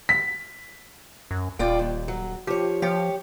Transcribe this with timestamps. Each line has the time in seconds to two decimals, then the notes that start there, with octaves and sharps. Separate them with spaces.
0.09 B6
1.31 F#2
1.59 D#1 F4 D5 G5
1.79 D#2
2.08 F#3
2.47 F3 G4 C#5
2.82 F3 G4 C#5